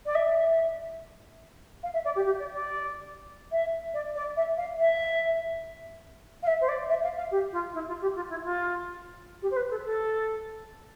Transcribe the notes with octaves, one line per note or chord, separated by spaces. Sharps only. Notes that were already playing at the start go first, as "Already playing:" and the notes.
D5
E5
F5
E5
D5
G4
G4
D5
D5
E5
D5
D5
E5
F5
E5
F5
E5
C5
D5
E5
F5
F5
G4
F4
E4
F4
G4
F4
E4
F4
G4
C5
B4
A4
A4